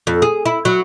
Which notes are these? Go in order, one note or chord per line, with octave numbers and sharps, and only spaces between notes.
F2
G#4
E4
F#3